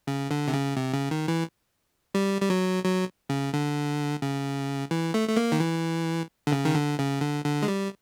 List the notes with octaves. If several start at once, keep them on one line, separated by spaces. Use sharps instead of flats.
C#3
D3
C3
C#3
C3
C#3
D#3
E3
G3
G3
F#3
F#3
C#3
D3
C#3
E3
A3
A3
A#3
D#3
E3
D3
C#3
D#3
D3
C#3
D3
D3
G#3
G3